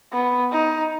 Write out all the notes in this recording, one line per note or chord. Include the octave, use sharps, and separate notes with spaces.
B3
D#4